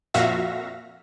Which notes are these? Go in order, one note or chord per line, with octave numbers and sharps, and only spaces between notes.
F2 A#2 F#4 E5 F5 A#6